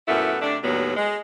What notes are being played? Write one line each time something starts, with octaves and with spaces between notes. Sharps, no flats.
F#2 A#2 A3 B3 E4
C3 A3 D4
D#2 A2 F#3 G3 B3
G#3